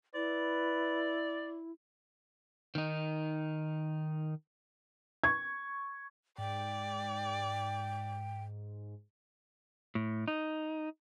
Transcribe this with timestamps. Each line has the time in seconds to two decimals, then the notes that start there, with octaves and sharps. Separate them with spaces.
0.15 E4 B4 D5
2.75 D#3 D#4
5.24 C#6 G#6
6.38 G#2 D5 G5
9.95 A2
10.28 D#4